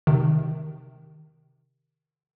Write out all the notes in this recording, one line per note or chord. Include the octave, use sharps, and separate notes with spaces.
C3 D#3